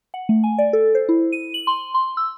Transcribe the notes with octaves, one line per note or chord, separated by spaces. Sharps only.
F#5
A3
G#5
D5
A4
C5
E4
D#7
F#7
C6
C6
E6